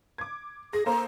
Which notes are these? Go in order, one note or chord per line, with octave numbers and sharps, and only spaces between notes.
D6 G#6
G#4 A#6
A#3 A4 C5 A#5